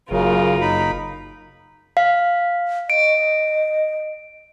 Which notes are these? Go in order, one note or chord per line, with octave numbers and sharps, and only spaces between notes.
F#1 F#2 C#3 F4 A#4
D#4 B5
F5
D#5 D7